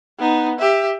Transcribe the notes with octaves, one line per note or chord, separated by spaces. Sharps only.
B3 D#4
G4 E5